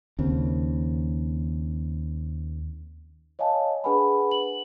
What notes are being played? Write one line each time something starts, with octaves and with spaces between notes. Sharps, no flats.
D#2 C#3 C4
C#5 D#5 F5 G#5 A5
D4 G#4 B4 F#5 G#5 B5
F#7